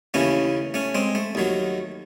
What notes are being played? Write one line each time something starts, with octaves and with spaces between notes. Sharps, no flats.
D#2 C#3 E3 A3 C#4
A3 C#4
G#3 C4
A3
D#2 D#3 F#3